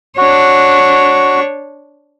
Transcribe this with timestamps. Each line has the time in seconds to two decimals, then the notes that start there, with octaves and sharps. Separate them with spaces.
0.17 D4 F#4 C#5